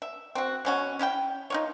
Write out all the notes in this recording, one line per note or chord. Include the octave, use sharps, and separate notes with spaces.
E5
C4 F#4
B2 C#4 F#4
C#4 E4 F5 G5
D#4 F4 C#5